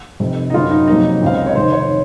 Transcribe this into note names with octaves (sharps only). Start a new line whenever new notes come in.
F1 F2 C3
D#4
F#1 F#2 C#3 F#3 F4
D#4
F2 C3 F#3 A#3 C#4 D#4
C#2 C#3 G#3 C4 F5
D#5
C#5
F1 F2 D#3 C5
C#5